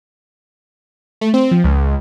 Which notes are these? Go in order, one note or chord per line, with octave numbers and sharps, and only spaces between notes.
A3
C4
F3
C#2